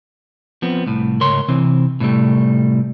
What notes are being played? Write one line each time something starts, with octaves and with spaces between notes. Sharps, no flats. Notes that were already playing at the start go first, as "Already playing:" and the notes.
F3 B3 C4
C2 A2
C#2 G#2 A#4 C#5 C6
C3 E3 C4
A2 C3 G3 A3